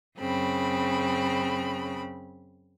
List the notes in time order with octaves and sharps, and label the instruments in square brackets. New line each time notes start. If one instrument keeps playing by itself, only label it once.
[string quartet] F#2 C#3 C4 B5